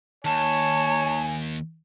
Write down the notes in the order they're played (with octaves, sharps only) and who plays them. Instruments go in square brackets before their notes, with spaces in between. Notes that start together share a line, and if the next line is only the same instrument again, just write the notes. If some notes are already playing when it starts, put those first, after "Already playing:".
[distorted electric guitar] D#2 [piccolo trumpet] C#5 [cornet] G#5 [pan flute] A5